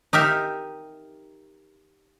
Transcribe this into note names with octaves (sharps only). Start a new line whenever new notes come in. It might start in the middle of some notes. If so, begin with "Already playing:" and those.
D#4 G4 A#4 E5